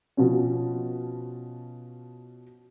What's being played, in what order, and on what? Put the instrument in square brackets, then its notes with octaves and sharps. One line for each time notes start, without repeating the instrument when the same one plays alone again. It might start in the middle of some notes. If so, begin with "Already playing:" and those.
[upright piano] B2 F3 C#4